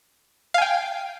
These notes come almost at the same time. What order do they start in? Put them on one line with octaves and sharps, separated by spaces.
F5 G#5 G5